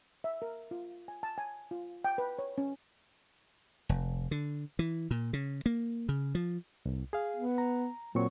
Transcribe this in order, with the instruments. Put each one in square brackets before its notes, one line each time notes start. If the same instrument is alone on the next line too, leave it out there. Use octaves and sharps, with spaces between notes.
[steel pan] E5
A#4
F4
G#5
A5
G#5
F4
G5
B4
C#5
C#4
[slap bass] F1
D3
E3
A#2
C#3
A#3
C#3
F3
[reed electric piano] C2
G#4 F5
[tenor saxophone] B3
[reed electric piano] A#5
[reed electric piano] A#2 C4 C#6 [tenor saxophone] F#3